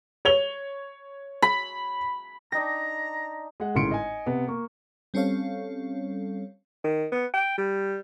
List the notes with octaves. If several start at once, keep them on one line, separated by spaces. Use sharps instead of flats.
C#5 F7 G7
B5
D4 D#4 G5 A#5 A#6
G#3 F#5
G#1 A2 C#3 C6 C#7 D7
D#5 G#5
C3 B3
A#3 C#6
G3 C4 C#4 A4 C#5 F5
D#3
B3
G5
G3